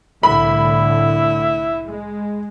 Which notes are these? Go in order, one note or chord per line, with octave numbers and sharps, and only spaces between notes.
C2 A2 D3 E4 B5
G#3